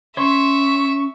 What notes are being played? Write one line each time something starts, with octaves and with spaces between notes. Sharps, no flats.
C#4 C#5 E5 C6 C#6